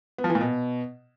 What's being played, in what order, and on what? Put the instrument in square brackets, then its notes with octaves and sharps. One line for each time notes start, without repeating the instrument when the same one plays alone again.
[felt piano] B3
F3
E3
A#2
B2